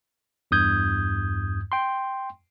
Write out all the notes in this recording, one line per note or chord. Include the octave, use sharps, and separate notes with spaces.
E2 G2 D#6 G6 G#6
G5 C6